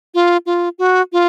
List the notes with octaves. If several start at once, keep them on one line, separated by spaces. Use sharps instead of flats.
F4
F4
F#4
F4